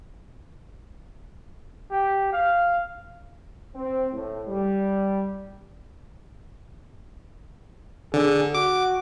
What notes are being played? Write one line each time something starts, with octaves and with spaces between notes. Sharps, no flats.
G4
F5
C4
A2
G3
D3 G#4
F#4 D6